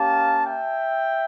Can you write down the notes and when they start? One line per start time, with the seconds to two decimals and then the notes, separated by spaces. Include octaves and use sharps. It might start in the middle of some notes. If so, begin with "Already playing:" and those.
Already playing: A#3 C#4 G4 F5 A5
0.46 E5 G5